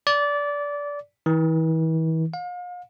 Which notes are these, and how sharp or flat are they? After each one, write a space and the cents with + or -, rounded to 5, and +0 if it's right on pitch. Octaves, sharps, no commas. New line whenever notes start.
D5 -20
E3 -40
F5 +40